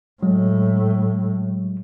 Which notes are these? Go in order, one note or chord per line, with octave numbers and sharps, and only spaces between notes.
A2 F#3 G#3